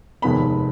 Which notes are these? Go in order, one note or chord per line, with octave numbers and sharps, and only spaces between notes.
F1 D#2 D#3 G#3 B3 B5